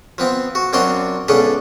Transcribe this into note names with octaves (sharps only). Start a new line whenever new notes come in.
F3 B3 C4
F#4
F#2 C4 D4 F4 F#4 C6
C#2 C#3 B3 D4 A4